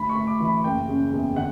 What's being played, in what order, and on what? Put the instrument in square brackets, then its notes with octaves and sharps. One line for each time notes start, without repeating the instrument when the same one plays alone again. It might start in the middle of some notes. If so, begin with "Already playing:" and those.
Already playing: [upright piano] D2 B5
C#6
D2
D6
E3
B5
F#1 G5
C#3
E2
D3 F#5